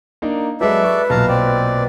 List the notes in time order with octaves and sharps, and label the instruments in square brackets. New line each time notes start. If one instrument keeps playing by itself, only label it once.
[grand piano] A#3 D4 D#4
[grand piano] F#3 G#3 [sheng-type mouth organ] A4 D5 E5 [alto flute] B4
[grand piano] C#6
[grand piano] B1 A#2 [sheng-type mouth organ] F5 A5 A#5
[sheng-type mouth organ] C4 D5